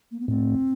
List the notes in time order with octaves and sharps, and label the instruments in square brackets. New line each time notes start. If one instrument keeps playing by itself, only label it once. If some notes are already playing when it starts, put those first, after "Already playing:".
[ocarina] A#3
B3
[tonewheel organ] A2 [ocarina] C4